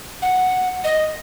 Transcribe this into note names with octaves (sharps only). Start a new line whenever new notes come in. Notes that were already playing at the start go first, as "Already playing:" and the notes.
F#5
D#5